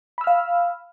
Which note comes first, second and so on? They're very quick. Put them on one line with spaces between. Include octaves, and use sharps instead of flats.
B5 E6 F6 F5